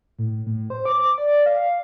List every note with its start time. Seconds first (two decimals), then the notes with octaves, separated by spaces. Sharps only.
0.19 A2
0.46 A2
0.70 C5
0.85 D6
1.18 D5
1.46 F5